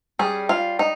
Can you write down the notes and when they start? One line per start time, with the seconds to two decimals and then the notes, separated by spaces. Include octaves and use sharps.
0.19 G3 C#4 G#4
0.49 F4
0.79 D#4